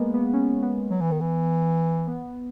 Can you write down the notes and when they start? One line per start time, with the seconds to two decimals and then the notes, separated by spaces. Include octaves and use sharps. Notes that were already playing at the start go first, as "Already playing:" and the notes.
Already playing: G#3 A#3 B3
0.14 B3
0.33 C#4
0.63 B3
0.91 F#3
1.01 E3
1.11 D#3
1.21 E3
2.07 B3